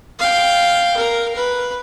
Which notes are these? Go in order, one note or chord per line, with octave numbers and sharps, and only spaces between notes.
F5 G5
A#4
B4